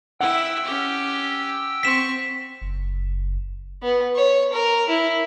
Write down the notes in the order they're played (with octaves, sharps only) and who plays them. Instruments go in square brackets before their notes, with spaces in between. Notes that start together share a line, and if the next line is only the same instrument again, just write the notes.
[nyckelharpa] E4 E5 [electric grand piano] F#5 [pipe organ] G5 E6
[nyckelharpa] C#4 G4
[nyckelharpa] C4 C#6 [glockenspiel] B6 E7
[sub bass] F#1
[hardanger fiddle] B3
C#5
A#4
E4